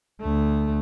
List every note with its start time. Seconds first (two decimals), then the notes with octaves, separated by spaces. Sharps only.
0.21 D2 A3